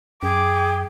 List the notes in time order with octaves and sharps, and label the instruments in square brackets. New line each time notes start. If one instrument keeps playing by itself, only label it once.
[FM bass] F#2 [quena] G#4 [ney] G5 [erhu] D6